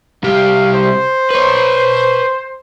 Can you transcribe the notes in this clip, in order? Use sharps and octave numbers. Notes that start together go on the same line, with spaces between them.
C2 G4 F5
C5
B4 C#5